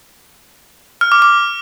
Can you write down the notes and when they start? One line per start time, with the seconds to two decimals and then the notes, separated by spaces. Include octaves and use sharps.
1.01 F6
1.12 D6
1.22 D6